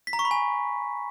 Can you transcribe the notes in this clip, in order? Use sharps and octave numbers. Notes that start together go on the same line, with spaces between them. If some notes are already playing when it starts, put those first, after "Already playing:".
B6
A#5
C#6
B5
G#5